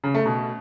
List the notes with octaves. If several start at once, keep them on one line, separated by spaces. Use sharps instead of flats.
C#3
A3
B2